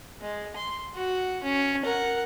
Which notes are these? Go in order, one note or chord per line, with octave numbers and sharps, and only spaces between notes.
G#3
C6
F#4
C#4
A#4 F#5